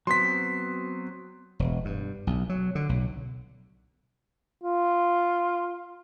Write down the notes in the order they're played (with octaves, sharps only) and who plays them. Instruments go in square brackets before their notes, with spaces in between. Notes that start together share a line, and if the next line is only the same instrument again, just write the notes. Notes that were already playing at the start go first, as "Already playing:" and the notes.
[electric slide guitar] F#3 B3 C4 [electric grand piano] C6 B6
[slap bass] E1
G2
B1
F#3
D3
B1
[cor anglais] F4